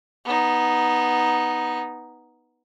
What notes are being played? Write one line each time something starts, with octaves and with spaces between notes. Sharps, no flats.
B3 D#4